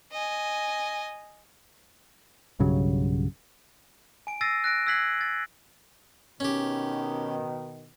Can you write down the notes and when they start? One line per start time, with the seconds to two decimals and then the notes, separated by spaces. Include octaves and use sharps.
0.12 D#5 G#5
2.59 B1 G2 C#3 F#3
4.27 G#5 D7
4.41 E6 A6 A#6 C7 D#7
4.64 F#6 A#6 D7
4.86 E6 F#6 G#6 B6 C7 F#7
5.21 A6
6.40 B2 D#3 C#4 G4